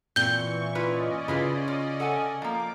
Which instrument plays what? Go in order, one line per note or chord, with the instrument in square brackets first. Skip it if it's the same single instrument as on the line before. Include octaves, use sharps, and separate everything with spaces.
[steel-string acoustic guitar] A#2 [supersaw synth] E3 C#6 [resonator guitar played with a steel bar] C4 [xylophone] G6 G7
[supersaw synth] C#4 D5 D#5 [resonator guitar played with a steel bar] E4 F4 B4
[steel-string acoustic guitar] C#3 [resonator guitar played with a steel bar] E4 F4 B4
[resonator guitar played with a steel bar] F4
A4 F#5 G#5
[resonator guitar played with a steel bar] F3 A#3 [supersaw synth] D6